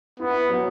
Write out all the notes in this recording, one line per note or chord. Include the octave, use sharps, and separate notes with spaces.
B3 E4
F#3